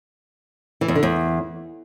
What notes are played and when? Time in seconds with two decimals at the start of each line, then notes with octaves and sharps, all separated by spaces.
0.81 E3
0.88 E2
0.96 D3
1.03 E2